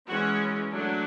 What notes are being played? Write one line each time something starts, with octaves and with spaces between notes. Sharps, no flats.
E3 G#3 C#4 F#4
F#3 A3 D4